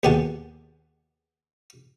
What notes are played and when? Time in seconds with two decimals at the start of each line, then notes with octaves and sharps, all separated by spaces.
0.03 D#2 B2 G4 G#4 F#5 A5